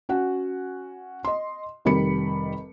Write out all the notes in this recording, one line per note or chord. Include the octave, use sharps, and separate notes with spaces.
C#4 F#4 F#5
D#5 C6
F1 D#3 G3 B5 C#7